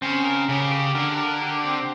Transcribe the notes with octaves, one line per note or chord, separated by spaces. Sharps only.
C#3 C4
A#4
C#3 G4
G4
D3 A#4
A#4
G4
C4